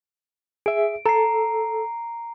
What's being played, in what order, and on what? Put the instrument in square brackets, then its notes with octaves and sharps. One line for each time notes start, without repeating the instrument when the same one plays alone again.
[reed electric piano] G#4 E5 [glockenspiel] D7
[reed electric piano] A4 [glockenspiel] A#5 C7